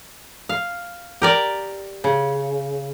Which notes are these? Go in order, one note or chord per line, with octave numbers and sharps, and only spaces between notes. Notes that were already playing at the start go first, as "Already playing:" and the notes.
F5
G4 A#4 D5
C#3